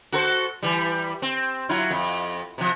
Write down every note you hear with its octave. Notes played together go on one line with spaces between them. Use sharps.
F#4 A4 C5
E3 G3
C4
F#3 E4 F4
F2
C3 F3